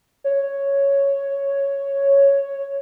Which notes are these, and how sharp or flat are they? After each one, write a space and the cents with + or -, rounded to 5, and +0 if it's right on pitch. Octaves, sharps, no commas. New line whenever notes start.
C#5 +0